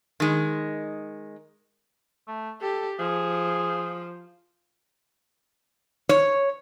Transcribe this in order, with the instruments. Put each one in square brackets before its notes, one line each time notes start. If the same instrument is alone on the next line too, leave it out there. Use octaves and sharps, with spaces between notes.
[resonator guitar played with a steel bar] D#3 G#3
[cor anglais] A3
[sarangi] G4 [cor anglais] A4
[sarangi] F3 [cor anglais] G#4
[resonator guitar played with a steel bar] C#5